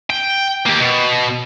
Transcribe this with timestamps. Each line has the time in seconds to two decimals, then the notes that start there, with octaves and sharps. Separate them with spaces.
0.10 G5
0.66 A#3 G4
0.80 B2